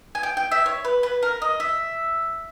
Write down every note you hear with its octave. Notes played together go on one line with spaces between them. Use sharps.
G#5
G5
G5
E5
C#5
B4
B4
A#4
D#5
E5